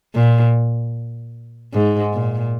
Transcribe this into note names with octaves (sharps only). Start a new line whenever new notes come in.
A#2
G#2
A#2